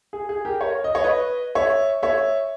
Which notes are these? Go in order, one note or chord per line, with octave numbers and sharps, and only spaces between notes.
G#4
G#4
G4 A#4
A#4 C#5
D#5
C#5
B4 D#5
C#5 E5
C#5 E5